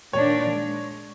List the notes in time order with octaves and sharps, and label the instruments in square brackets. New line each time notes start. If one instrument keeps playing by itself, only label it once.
[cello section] A#2 D#3 D4 [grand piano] C#5
[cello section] G#3